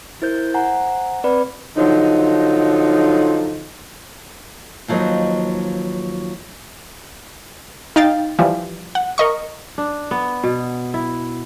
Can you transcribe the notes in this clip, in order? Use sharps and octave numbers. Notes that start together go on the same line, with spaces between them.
E4 A#4 C5 G6
C5 F#5 G#5 A#5
C4 B4 D5 B5
D3 F3 F#3 D#4
D#2 F3 F#3 D#4 B4 D#5
D#4 F5 G5 A6
E3 F3 G3
F#5
A#4 D#5 C#6
D4
B3
B2
E4